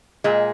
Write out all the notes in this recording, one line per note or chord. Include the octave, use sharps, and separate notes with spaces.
A#2 G#3